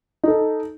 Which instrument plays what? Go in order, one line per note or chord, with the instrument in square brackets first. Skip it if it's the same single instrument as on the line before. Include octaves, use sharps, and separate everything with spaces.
[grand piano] D#4 A4